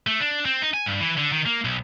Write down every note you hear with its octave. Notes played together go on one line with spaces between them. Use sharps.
A3
D4
C4
D#4
G#5
G2
E3
D3
D#3
A#3
B1